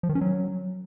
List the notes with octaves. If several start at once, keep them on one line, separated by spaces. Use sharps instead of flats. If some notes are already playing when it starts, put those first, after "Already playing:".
F3
D#3
C#4
F#3